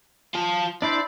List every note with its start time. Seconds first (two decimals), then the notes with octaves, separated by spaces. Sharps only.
0.35 F4 A5
0.82 D4 E4 C5 D5